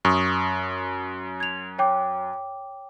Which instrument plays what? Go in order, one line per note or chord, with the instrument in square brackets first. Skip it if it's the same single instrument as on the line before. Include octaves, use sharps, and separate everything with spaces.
[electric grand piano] F#2 [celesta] C#6 D#6
[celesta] G#6 F7
C#5 G5 D6